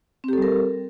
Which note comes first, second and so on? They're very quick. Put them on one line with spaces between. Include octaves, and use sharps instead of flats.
C4 G4 A4 G3 A#4